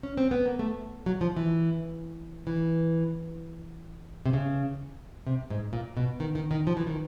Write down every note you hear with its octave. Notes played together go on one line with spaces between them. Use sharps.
C#4
C4
B3
A#3
A3
F#3
F3
E3
E3
C3
C#3
C3
G#2
A#2
B2
D#3
D#3
D#3
F3
E3
D#3